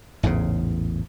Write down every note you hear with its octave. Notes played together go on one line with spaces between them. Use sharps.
A1 E2 G#2 C#3